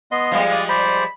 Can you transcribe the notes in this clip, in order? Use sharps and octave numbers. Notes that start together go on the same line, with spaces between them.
B3 D#5 C6
F3 G3 G#3 F5
D5 D#6
C5 D5 B5